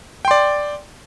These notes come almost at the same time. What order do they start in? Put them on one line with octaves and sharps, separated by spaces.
G5 C6 D5